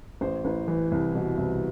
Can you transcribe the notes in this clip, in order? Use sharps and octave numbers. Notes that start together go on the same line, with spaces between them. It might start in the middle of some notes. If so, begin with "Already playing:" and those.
A1 C5
A1
E3
C2
B2
C2